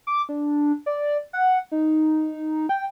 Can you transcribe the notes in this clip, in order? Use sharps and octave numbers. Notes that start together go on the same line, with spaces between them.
D6
D4
D5
F#5
D#4
G5